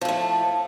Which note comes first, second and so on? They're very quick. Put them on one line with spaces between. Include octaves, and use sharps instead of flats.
F3 A2 A3